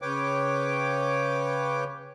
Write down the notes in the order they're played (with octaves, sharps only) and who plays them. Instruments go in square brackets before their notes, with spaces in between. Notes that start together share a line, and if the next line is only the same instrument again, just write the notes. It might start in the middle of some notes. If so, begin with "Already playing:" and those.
[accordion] C#3 B4 C#5 G5 D6